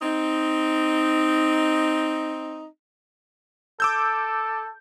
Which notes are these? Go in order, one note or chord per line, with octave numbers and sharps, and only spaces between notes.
C4 D#4
A4 D6 E6 G6